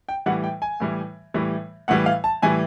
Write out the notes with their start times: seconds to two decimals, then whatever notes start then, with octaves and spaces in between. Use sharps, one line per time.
0.09 G5
0.26 A2 E3 G3 F#5
0.44 G5
0.62 G#5
0.80 A2 E3 G3
1.34 A2 E3 G3
1.88 A2 E3 G3 F#5
2.06 F5
2.24 A5
2.42 A2 E3 G3 G#5